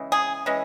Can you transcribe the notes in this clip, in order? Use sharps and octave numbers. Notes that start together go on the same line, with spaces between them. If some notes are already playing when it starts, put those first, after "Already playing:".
Already playing: C#3 E3 G#3
G#4
E3 G#3 C#4